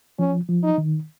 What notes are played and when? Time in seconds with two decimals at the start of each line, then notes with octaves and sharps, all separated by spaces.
0.18 F3 C#4
0.49 F3
0.63 D#4
0.78 D#3